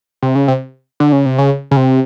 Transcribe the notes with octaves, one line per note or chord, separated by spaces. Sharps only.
C3
C#3
C3
D3
C#3
C3
C#3
C#3
C3